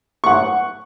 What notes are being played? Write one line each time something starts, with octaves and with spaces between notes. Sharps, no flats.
F#5 C#6